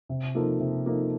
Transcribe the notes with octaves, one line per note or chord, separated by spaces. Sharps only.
C3
F3 A#3 D#4 A4
C3
F3 A#3 D#4 A4